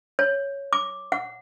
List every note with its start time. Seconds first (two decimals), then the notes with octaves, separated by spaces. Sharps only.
0.19 C#5
0.73 D6
1.12 F#5